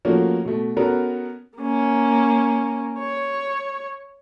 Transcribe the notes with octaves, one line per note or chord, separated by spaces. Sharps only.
F3 A3 A#3 C#4 F#4
B2 A3
B3 C#4 F#4 A4 A#4
A#3 C#4
C#5